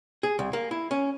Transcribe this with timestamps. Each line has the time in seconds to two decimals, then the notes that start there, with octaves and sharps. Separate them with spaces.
0.23 G#4
0.39 C2
0.53 A#3
0.71 E4
0.91 C#4